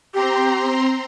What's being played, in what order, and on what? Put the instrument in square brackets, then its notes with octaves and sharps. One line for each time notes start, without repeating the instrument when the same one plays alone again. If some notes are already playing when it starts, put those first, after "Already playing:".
[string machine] C4 A#5 C6 [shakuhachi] G4